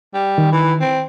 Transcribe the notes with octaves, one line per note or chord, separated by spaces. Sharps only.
G3
D#3
E3
C4